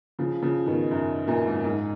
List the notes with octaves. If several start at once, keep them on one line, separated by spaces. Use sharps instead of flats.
C#3 F3
C#3 F3
B2 D#3
F#2
F#2 A#2
G#2
G#2